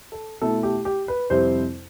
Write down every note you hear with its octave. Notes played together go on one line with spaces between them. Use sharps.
A4
B2 A3 E4 A4
G4
G4
B4
F2 C3 G3 C4 E4 C5